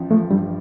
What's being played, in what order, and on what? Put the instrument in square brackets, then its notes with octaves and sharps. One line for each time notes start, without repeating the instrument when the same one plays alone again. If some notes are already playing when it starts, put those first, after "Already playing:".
Already playing: [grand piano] A1 F3
[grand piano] F3 [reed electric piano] A3
[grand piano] G2 [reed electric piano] G3